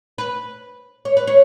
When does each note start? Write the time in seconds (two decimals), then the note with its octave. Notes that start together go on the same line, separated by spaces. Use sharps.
0.18 B4
1.05 C#5
1.17 B4
1.27 C#5